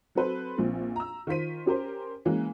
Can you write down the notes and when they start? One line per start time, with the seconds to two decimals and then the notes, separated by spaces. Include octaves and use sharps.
0.15 F#3 C4 A4 B4 C5
0.58 A#1 A#2 C4
0.96 A#5 E6
1.27 D#3 F4 C5 B6 D#7
1.66 C#4 G4 A#4 C5
2.25 E3 G#3 A#3 C#4